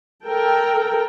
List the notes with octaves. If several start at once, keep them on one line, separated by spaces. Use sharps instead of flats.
A4 A#4 G5